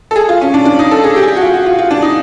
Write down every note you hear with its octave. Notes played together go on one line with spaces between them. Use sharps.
A4
G#4
F4
C#4
D4
D4
D#4
A4
G#4
G4
G#4
G4
F#4
F4
F#4
F4
F4
D4
D#4